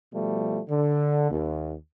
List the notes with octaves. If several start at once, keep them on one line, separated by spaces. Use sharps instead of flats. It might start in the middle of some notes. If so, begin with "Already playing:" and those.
B2 F3 G3 A3
D3
D#2